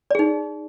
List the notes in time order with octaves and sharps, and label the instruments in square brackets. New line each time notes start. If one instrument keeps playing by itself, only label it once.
[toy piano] D5
G#4
D#4